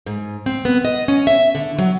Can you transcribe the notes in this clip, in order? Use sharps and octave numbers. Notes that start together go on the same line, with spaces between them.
G#2
C4
B3
D#5
C#4
E5
D3
F#3